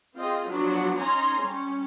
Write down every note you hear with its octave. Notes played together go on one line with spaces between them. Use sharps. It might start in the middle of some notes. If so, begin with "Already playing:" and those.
C4 F4 G#4 D#5
F3 F#3 B3 D4 F#4
C#4 D#4 G#5 A#5 C6
G3 C#4